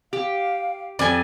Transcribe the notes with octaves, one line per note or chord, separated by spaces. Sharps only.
G4 F5
F2 D5 G#5